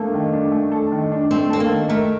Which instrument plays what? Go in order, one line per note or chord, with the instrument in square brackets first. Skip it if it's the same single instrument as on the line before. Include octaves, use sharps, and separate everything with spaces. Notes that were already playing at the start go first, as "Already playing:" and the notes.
Already playing: [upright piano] A3 D4 A4 [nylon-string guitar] A#3
[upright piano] D#3
D4
A3
A4
D#3
D4
[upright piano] A3 [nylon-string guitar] C4
[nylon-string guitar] C4 [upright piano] A4
[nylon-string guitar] A#3
[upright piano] D#3
[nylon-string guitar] A3 [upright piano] A#4